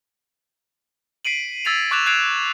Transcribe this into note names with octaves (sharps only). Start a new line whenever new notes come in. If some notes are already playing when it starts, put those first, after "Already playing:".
B6 C7 D7 D#7 F#7
E6 G#6 A6 B6 D#7 F7
C#6 D6 F#6 G#6 E7 F7
F#6 G#6 C7 D7 E7 F7